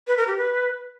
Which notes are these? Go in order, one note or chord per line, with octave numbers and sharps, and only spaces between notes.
B4
A#4
G4
B4